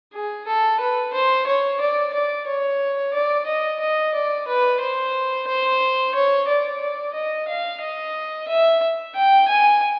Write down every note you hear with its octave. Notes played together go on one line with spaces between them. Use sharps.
G#4
A4
B4
C5
C#5
D5
D5
C#5
D5
D#5
D#5
D5
B4
C5
C5
C#5
D5
D5
D#5
F5
D#5
E5
G5
G#5